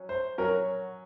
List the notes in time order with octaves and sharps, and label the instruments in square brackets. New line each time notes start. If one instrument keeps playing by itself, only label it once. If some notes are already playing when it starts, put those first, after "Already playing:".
Already playing: [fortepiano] F#3 C#4
[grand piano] C5
[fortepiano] F#3 C#4 F#4 [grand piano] A#4